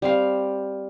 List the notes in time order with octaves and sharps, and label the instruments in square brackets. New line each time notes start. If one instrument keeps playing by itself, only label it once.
[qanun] G3 C4 F5